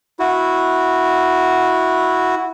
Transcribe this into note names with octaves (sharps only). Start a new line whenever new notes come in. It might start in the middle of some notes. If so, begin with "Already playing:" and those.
E4 F#4